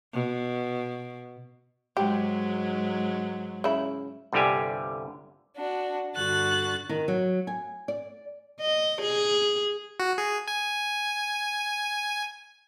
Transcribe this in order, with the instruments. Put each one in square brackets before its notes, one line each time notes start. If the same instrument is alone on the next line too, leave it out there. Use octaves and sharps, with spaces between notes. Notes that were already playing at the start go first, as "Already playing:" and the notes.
[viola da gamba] B2
[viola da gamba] G#2 F#3 G#3 [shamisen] G4
[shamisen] C#3 E4
[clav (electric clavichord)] G1 C2 D3 G3 G4 G#5
[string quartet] D4 F#4
G2 D3 F#4 F#6 A6
[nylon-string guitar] D#3
F#3
G#5
D5
[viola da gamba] D#5
G#4
[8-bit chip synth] F#4
G#4
G#5